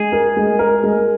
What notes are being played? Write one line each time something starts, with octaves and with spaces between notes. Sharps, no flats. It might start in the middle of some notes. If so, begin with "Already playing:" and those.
Already playing: G#3 G#4
A#4
G#3
A#4
G#3